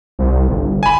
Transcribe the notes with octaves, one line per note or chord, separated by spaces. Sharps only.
C2
G1
G#5 B5